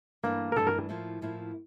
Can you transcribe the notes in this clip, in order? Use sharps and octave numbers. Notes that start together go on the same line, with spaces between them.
G2 E3 A3 A#3 D4
A#4
G2 E3 A3 D4 A4
A#4
A2 F3 A#3 E4
A2 F3 A#3 E4